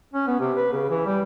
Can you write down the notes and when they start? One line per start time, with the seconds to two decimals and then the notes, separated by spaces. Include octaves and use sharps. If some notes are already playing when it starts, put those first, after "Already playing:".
0.13 C#4
0.27 B3
0.40 C3
0.57 B4
0.72 C#3
0.90 E3
1.06 G3